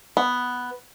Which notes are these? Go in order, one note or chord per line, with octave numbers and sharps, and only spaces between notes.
B3